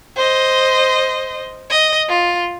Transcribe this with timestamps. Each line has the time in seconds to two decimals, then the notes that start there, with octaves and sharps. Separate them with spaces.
0.16 C5 D#5
1.70 D#5
2.09 F4